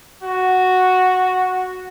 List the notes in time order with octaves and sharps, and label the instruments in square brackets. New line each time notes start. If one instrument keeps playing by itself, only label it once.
[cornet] F#4